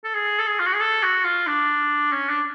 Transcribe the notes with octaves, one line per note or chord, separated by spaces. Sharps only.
A4
G#4
A4
G#4
F4
F#4
G#4
A4
F#4
F4
D4
C#4
D4